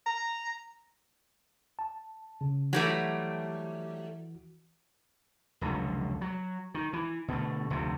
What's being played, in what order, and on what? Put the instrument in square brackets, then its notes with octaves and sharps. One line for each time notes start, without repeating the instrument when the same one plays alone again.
[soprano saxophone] A#5
[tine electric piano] A5
C#3
[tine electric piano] E3 F#4 [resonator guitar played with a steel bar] F#3 G3 A3
[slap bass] F1 C#2 D3 F#3
F#3
D#3
E3
B2 D3 E3 A3
F1 D2 C3